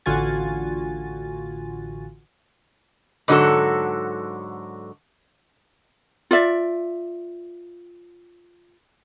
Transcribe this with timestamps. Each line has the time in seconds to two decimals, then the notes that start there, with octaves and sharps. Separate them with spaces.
0.06 A1 D3 F4 F#4 G#5 A6
3.28 G#2 D3 F#3 A3 F#4 A4
6.31 F4 D5 E5